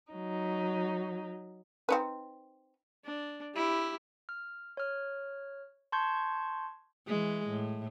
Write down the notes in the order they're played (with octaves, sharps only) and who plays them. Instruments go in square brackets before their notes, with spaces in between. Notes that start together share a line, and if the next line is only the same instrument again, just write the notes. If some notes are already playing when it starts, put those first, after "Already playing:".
[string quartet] F#3 D#4
[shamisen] C4 D#4 B4
[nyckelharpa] D4
E4 G4
[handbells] F6
C#5 F6
A5 C6 C#6 G6 G#6
[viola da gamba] E3 G#3
A2